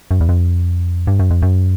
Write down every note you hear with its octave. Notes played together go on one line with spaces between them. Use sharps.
F#2
E2
F2
G2
F#2
F2
F#2